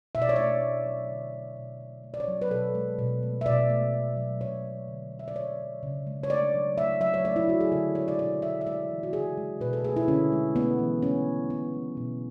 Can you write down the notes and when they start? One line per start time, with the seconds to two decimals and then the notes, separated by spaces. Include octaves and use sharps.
0.15 B2 E5
0.22 D5
0.29 C#5
0.36 A3 D5
0.62 A3
0.85 F#3
1.10 D3
1.33 A3
1.56 B2
1.81 A3
2.04 A3
2.14 D5
2.20 C#5
2.28 F#3
2.41 B4
2.51 B2 A4
2.75 G#3
2.99 B2
3.23 A3
3.41 E5
3.46 B2 D5
3.70 A3
3.94 A3
4.17 F#3
4.41 B2 C#5
4.65 A3
4.88 D3
5.12 A3
5.19 E5
5.28 D5
5.35 A3 C#5
5.59 F#3
5.83 C#3
6.07 G#3
6.23 C#5
6.30 A3 D5
6.54 F#3
6.77 A3 E5
7.01 F#3 E5
7.14 C#5
7.24 A3 D5
7.36 E4
7.48 F#3 F#4
7.61 G#4
7.72 D3 A4
7.95 G#3 C#5
8.08 D5
8.19 B2 D5
8.42 A3 E5
8.61 E5
8.66 G#3 D5
8.90 E3
9.03 F#4
9.13 C#3 G#4
9.37 G#3
9.60 B2 B4
9.73 A4
9.84 A3 G#4
9.96 E4
10.08 D3 C#4
10.32 G#3
10.56 A3 B3
10.79 E3
11.02 A3 C#4
11.27 F#3
11.50 A3 B3
11.73 F#3
11.97 B2